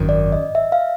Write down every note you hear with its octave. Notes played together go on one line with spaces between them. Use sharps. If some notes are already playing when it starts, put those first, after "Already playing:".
Already playing: G#1 F#2 D#3
D5
D#5
E5
F5